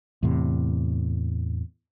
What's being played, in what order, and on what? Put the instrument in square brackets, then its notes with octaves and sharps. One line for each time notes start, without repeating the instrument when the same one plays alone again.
[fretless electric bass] E2 A2 C3